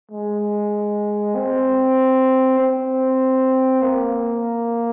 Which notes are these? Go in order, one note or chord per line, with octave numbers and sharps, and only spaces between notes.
G#3
C4
C4
A#3